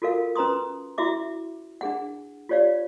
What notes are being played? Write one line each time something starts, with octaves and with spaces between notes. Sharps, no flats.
F4 F#4 A4 A#4 F5
C#4 B4 A#5 C6 D#6
E4 F#4 E5 D6
D4 G#4 F#5
F4 G4 C#5 D5 F5